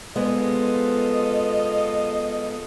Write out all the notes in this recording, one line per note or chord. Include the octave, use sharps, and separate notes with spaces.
G#3 B3 F4 A4 C5 D#5